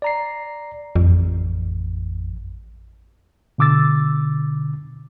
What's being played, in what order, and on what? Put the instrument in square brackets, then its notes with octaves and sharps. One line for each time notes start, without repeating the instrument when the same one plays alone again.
[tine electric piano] D5 A#5 C7
[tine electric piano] A1 [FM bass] F2
[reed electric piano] B2 D3 D6 E6 A6